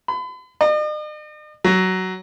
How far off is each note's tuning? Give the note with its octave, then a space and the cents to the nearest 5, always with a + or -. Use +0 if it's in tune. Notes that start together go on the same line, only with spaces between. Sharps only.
B5 +40
D#5 -45
F#3 +10